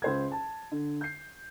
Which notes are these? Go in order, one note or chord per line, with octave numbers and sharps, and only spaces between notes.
C#2 C5 G#6
A5
D3
G6 C7